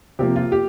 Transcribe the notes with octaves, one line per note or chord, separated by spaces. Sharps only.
C3 F3 A#3 G4
F4
G4